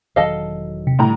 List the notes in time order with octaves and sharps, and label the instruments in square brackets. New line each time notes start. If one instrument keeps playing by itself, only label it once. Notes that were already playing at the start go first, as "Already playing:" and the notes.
[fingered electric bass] E1 D#3 F#3 [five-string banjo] A4 D#5 F5
[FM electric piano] C3
[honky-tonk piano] A2 A#5 [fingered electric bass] D3 G3